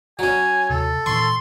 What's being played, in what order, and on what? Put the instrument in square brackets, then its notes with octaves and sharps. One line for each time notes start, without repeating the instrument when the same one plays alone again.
[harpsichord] F#3 C#4 [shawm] G#5
[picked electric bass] D#2 C3 [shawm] A4
[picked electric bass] A#2 D#3 E3 [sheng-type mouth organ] C6 [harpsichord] C#6